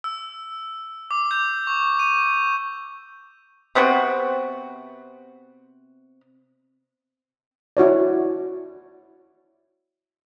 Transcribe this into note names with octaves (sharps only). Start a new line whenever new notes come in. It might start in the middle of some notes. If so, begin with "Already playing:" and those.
E6
D6
G6
C#6
D#7
C3 B3 C4 F#4
E4 F#4 C#5 D5